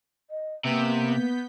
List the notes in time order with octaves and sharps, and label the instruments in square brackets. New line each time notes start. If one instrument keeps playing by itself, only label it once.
[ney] D#5
[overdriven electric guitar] C3 [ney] A#3 [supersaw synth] B3 G6 B6